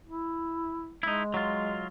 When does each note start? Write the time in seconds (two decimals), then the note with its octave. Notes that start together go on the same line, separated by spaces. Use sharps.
0.07 E4
1.03 G#3 D#4 E4
1.34 F#3 F4